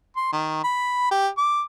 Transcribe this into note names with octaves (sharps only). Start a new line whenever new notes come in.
C6
D#3
B5
G4
D6